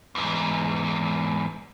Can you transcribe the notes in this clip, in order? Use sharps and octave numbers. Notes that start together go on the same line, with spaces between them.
E2 G#2